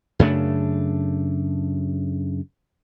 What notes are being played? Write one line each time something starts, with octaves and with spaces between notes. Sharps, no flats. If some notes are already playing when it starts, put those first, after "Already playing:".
F#2 C#3 A3 D4